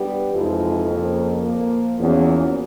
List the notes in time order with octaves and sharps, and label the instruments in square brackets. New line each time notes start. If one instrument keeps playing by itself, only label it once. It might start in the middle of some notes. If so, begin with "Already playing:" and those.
Already playing: [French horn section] G3 B3 D4 G4 B4
[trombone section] F2 [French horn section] C3 E3 G#3 C4 D#4
[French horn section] C#3 F3 A#3
A#2 F3 A#3
[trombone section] E2 [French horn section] A#2 F3 A#3 C#4 F#4